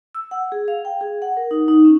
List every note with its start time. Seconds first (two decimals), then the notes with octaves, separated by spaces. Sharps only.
0.15 E6
0.31 F#5
0.52 G#4
0.68 F5
0.85 G5
1.01 G#4
1.22 F#5
1.37 A#4
1.51 D#4
1.68 D#4
1.85 C#4